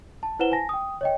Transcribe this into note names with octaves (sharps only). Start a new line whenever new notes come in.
A5
E4 B4 C5 F#5 E7 G7
G#5 A5 A#6
G5 D#6
C#5 D#5 G5